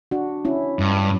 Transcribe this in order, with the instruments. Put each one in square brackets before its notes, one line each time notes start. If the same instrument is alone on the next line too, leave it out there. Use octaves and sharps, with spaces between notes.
[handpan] D4 F#4
C#4 E4
[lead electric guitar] G2